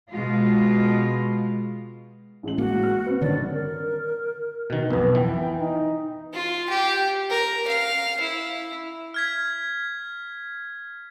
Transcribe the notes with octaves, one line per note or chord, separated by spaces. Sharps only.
B2 G#3 F4
A1 G#3 F#7
A#3 F#4
F6
C4 B4
G2 D3 D#3 C#5 D5
A#4
B2 D#3
B1 F2 B3
E3 G5
D#4
F4
G4
A#4
F5
E4
F6 G#6 B6